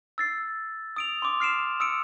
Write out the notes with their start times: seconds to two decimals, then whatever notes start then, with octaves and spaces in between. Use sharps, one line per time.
0.18 E6 A6 C7
0.96 D#6 D7 F7
1.22 C6 D6
1.40 F6 C7 D7 E7
1.80 D#6 E6 C#7 D7